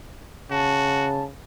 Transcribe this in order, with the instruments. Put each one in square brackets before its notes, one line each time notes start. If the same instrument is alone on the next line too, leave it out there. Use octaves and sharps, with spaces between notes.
[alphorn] C#3 [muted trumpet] F#4 [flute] A5